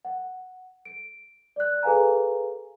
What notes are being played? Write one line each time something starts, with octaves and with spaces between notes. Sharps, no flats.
F#5
D7
D5 F#6
G#4 A4 B4 F5 G#5 A#5